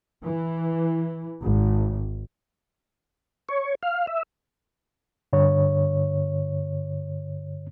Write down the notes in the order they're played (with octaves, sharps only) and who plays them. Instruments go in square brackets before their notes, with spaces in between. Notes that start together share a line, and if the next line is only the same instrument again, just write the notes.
[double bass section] E3
G#1
[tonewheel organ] C#5
F5
E5
[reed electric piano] G2 D3 C#5